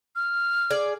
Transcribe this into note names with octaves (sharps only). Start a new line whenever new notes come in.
F6
G#4 D5